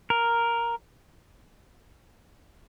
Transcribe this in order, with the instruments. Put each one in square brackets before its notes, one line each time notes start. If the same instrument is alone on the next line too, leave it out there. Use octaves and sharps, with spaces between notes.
[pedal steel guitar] A#4